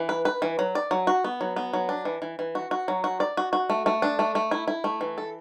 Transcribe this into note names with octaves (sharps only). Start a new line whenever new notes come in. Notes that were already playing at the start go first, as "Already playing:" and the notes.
Already playing: E3
B4
B4
E3
F#3
D5
F#3
F#4
B3
F#3
B3
F#3
D4
E3
E3
E3
F#4
F#4
F#3
F#4
D5
F#4
F#4
A3
A3
D4
A3
A3
E4
E4
A3
E3
A4